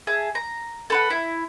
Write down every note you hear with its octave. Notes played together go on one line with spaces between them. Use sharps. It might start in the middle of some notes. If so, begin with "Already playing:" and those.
G#4 E5 A5
A#5
A4 B4 F#5
E4